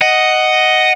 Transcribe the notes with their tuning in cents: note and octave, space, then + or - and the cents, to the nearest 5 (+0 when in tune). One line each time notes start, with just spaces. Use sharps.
D#5 +0 F#5 +5